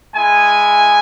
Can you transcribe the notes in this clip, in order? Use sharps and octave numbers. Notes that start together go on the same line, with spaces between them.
G#3 E4 G#5